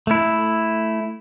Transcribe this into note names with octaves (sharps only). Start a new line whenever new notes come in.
A3 E4